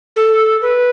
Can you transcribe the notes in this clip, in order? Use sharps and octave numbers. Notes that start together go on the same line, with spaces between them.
A4
B4